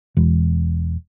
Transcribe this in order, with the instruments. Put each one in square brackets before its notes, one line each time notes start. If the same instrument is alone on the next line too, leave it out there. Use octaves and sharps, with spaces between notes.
[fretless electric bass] E1